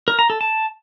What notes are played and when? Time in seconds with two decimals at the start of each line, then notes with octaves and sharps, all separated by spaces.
0.08 A#4
0.19 A#5
0.30 A4
0.41 A5